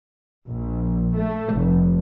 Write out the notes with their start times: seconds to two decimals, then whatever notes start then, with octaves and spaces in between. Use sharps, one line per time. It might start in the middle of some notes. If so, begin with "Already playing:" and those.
0.45 A#1
1.14 A3
1.52 F1